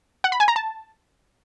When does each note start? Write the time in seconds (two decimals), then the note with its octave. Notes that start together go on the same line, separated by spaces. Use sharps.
0.24 F#5
0.32 B5
0.40 G#5
0.48 A#5
0.56 A5